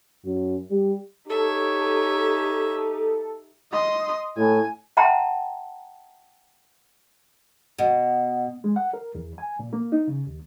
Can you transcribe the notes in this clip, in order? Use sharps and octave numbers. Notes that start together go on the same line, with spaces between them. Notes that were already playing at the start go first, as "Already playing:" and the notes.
F#2
G3
D#4 G4 A4 C#5 E5
D#5 C6
A2 G#5
E5 F#5 G5 A5 A#5 C6
B2
G#3
F#5
A#4
E2
G#5
A#2
A#3
D#4
C#3
D#2